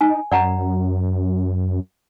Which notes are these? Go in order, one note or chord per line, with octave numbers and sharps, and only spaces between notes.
D#4 G#5
F#2 D5 F#5 A#5